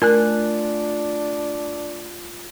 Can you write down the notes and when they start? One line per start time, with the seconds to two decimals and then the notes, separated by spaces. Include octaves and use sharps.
0.02 A3 D4 F4 A#4 G#5 F#6